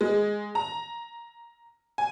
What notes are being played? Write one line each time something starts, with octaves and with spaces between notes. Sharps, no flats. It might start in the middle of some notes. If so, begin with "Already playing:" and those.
G#3
A#5
G#5